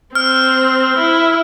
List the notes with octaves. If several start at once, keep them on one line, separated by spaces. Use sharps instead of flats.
C4 F6
E4